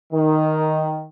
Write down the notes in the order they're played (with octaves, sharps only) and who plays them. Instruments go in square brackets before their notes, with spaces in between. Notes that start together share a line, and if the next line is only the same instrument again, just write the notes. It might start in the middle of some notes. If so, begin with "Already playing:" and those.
[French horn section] D#3